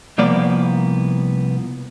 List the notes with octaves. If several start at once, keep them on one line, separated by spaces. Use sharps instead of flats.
C2 F3 A#3 B3 D5